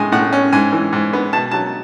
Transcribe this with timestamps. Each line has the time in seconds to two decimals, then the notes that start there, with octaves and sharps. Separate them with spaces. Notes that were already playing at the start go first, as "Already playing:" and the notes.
Already playing: A2 G#3 G#5
0.12 A2 F#5
0.33 C#4
0.53 G#2 G#5
0.73 E3
0.93 G#2
1.13 B3
1.33 B2 A5
1.51 F#3 A5